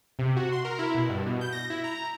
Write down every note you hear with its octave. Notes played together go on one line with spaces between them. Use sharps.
C3
F#4
C6
A#4
E4
B2
G2
B2
G6
A#6
E4
A#5